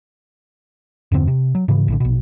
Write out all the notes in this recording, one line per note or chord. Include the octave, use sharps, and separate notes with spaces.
E2 G2 D3 C4
C3
F#3
G#2 C#3 E3
A#1 A2 D3
A#1 B2